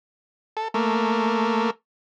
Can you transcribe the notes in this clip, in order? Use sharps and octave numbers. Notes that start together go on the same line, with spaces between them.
A4
A3 A#3